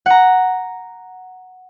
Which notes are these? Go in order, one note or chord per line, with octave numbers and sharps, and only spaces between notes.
F#5 A#5